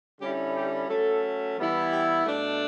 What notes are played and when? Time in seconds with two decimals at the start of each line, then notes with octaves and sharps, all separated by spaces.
0.20 D3 G3 C#4 E4 G4
0.53 G4
0.88 F#3 A3 C#4 A4
1.57 E3 G3 B3 E4
1.92 G4
2.25 B2 A3 D4